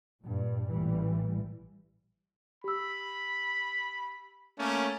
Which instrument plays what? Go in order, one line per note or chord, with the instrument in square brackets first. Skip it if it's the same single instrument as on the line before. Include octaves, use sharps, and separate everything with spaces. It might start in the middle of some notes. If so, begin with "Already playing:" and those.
[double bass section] G2 A#2
A1 A#2 E3 G3
[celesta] G4 E6 [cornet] B5
[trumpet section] A3 A#3 C#4